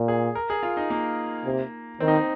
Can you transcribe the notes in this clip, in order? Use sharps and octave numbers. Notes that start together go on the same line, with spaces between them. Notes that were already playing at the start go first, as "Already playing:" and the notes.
Already playing: A#2
G#4
A#4
G#4
F4
D#4
A#3
C3
D#3 C4
D#4
C4